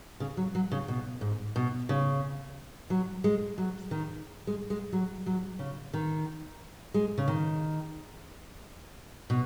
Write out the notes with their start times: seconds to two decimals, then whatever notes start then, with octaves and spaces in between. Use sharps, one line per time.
0.20 C#3
0.37 F#3
0.55 F#3
0.72 C#3
0.88 B2
1.21 G#2
1.56 B2
1.89 C#3
2.90 F#3
3.24 G#3
3.58 F#3
3.91 D#3
4.47 G#3
4.70 G#3
4.92 F#3
5.26 F#3
5.59 C#3
5.94 D#3
6.94 G#3
7.18 C#3
7.28 D#3
9.30 B2